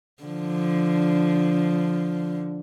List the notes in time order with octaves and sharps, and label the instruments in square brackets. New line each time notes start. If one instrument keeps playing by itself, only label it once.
[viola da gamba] D3 F3